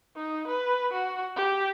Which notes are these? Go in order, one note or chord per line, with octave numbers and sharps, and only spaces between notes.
D#4
B4
F#4
G4